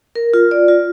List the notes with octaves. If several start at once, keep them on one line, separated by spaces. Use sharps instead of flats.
A#4
F4
D5
F4